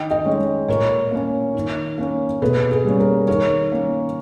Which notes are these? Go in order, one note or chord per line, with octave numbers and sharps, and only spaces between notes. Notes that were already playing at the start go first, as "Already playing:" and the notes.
Already playing: D#3 D#5 G5
D#5 G5
G#3 C#4
A#2 A#4 C#5
A#3 C#4
D#3
A#3 C#4
B2 G#4 B4
G#4
G3 A#3 C#4
A#4
D#3 A#4 C#5
A#3 C#4